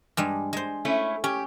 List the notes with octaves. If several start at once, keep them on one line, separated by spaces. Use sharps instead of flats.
G2 G3 G#3
G#3 C5
A3 C#4 E4
C#4 G4